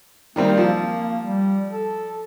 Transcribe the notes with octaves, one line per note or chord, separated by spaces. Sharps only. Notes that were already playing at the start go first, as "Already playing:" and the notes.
D#3 G3 A#3 C4
F3 A#3
G3
A4